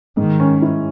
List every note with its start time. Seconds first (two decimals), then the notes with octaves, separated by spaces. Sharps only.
0.17 G#2 D#3
0.40 C#4
0.62 E4